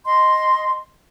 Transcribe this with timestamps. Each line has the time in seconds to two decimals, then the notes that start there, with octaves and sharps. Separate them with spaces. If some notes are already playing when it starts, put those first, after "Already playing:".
0.05 D#5 C6